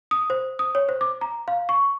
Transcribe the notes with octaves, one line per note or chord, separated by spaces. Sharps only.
D#6
C5
D#6
C#5
C5
D6
A#5
F5
C#6